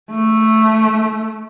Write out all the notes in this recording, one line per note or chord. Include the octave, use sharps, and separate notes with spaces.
A3